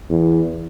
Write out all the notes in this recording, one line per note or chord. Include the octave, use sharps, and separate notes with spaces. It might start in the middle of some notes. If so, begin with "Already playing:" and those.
E2